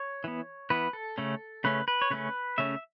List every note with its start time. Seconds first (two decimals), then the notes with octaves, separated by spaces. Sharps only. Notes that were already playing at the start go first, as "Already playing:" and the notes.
Already playing: C#5
0.24 E3 B3
0.70 E3 B3 B4
0.93 A4
1.18 C#3 A3 C#4
1.64 C#3 A3 C#4 B4
1.88 B4
2.02 C#5
2.10 C#3 A3 C#4 B4
2.58 C#3 A3 C#4 E5